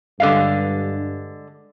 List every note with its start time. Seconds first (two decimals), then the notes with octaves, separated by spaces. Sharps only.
0.20 G2 D3 G#3 F5